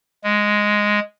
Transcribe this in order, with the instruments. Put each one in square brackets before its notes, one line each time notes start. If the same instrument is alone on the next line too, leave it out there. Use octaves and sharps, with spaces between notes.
[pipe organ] G#3